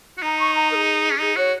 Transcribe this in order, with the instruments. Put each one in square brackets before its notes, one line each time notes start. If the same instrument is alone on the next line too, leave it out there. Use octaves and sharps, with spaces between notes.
[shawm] F#4
[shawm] D#4 [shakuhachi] A#5
[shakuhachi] C#6
A#5
A#4
G#4
[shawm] C#4
[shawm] D#4 [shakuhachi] G#4
[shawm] F#4 [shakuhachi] C#5